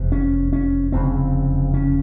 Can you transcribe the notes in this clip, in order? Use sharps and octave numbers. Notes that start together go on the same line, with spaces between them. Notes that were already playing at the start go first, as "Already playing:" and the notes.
Already playing: F1 E2 C3
C#4
C#4
F1 E2 C#3 C4
C#4